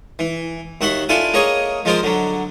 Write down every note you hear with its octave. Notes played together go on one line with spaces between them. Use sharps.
E3
D#2 F#4 E5 F#5 C6
D4 E4 F4 A4 G#5
A#3 G#4 C#5 D#5 A#5
F3 G#3 F4 A#4 C5
D3 F#3